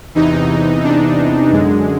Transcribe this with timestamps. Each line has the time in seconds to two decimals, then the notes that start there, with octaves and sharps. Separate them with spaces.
0.15 E2 C3 E3 D#4
0.84 D4
1.52 F#2 D3 G#3